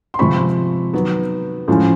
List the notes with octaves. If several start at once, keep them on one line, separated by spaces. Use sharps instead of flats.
C6
C3 F3 G#3 C4 B5 C#6
D#3 F#3 B3
A2 F3 G#3 C#4